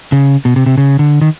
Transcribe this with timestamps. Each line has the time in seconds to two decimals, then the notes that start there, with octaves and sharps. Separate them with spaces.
0.12 C#3
0.45 B2
0.56 C3
0.66 C3
0.78 C#3
0.99 D3
1.22 D#3